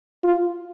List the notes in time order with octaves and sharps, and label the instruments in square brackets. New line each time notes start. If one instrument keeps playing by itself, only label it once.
[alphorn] F4